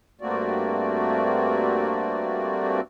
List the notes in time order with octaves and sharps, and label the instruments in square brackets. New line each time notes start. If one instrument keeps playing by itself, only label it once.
[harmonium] G2 A3 A#3 C4 F#4 D5